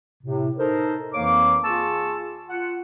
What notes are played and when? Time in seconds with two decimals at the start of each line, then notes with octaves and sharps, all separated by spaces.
0.23 A2 C3
0.57 D#4 A4 A#4 C5
1.14 F2 E3 A#3 C#5 F5 D6
1.64 F4 G#4 A5 C#6 E6
2.48 F4 F#5